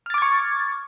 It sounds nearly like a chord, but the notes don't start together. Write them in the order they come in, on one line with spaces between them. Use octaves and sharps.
F6 A6 D6 G#6 C#6